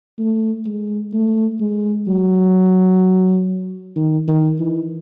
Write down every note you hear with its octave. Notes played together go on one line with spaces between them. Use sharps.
A3
G#3
A3
G#3
F#3
D#3
D#3
E3